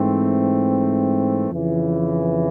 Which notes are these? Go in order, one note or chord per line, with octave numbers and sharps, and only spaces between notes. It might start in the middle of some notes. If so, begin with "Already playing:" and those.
Already playing: G#2 E3 A3 C4
F2 C#3 E3